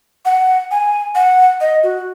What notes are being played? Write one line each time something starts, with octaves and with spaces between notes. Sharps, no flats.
F#5
G#5
F#5
D#5
F#4